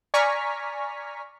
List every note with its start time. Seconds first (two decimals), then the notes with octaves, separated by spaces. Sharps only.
0.14 D5 G#5 A#5 C#6 F6 B6